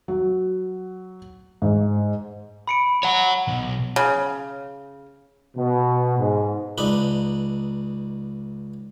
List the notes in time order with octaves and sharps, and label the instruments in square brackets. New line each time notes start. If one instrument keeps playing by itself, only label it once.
[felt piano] F#3
G#2
[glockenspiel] B5 C#7 D7
[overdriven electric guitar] C#5 F#5
[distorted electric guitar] B1
[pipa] C#3
[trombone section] B2
G#2
[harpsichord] C#2 D4 D#4 B4 B5